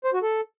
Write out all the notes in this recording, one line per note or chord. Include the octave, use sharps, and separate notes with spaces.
C5
F#4
A4